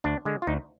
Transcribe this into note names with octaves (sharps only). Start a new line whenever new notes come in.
D2 D4
D3 G#3
F4
D2 D#4